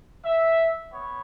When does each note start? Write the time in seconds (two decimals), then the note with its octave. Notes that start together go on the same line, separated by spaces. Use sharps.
0.25 E5
0.92 B3 C#5